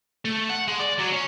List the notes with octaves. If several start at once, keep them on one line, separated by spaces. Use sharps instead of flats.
A3
F#5
G#3
D5
F#3
C#4